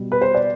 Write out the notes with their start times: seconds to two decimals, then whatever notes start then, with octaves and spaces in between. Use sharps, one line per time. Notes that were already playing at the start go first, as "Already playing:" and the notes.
Already playing: B2 G3
0.12 B4
0.22 C5
0.35 D5